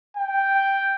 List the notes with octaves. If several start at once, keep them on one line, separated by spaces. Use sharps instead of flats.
G5